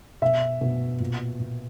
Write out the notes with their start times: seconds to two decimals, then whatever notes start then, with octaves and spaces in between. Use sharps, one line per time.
0.22 B2 E5
0.61 B2
1.00 A#2
1.40 A#2